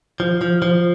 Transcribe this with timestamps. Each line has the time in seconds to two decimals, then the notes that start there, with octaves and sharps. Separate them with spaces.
0.20 F3
0.41 F3
0.62 F3